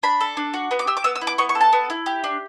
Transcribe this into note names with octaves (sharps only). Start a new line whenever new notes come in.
D4 B5
A4
D4
F#4
B3
D6
G4 E6
D6
B3 E6
E6
E4
D6
B3 C#6
C#6
A4
A5
B3
E4
G4
D4